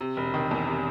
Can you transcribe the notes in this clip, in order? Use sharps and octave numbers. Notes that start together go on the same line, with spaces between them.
C3
E1
D#3
E2
C3